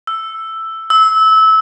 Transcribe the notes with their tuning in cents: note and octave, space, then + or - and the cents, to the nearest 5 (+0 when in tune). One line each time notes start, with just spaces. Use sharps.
E6 +5
E6 -20